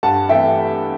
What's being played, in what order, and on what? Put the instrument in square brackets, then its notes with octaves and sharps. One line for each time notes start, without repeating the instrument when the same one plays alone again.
[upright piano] G2 F#5 A5
E3 A3 E4 E5 G5